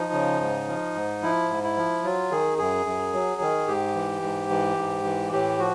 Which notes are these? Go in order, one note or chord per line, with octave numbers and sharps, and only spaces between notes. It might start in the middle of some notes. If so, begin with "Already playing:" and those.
Already playing: F3 D#4
C#3
G#2
F3
G#2
F3 E4
G#2
E4
F3
F#3 F4
D#3 G#4
F#2 G#4
F#2
F#3
D#3
G#2 G4
E3
G#2
E3
G#2
E3
A2 G4
F3 F#4